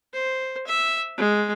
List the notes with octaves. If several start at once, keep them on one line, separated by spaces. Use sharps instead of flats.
C5
E5
G#3